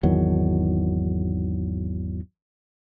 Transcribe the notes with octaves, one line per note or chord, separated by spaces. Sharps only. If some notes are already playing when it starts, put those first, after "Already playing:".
G#1 E2 D#3 F#3